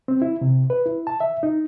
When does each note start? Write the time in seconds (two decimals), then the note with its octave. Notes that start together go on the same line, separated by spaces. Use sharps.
0.08 C4
0.22 E4
0.41 C3
0.70 B4
0.86 E4
1.07 A5
1.20 E5
1.43 D#4